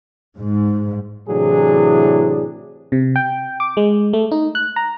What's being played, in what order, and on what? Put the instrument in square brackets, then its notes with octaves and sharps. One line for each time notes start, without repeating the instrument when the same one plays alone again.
[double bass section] G#2
[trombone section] A2 C3 E3 F#3 D4 G#4
[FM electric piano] C3
G5
D6
G#3
A3
D#4
F#6
A#5